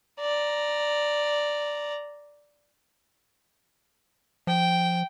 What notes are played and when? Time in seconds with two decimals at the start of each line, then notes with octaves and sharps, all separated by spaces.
0.20 D5 A#5
4.47 F3 G5